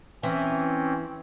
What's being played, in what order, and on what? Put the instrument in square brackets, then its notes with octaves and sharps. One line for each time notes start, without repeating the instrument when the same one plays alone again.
[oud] E3 [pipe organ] C4 C#4